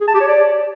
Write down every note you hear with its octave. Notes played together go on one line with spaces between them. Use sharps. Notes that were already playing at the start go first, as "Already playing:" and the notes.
G#4
A5
G4
C#5
D5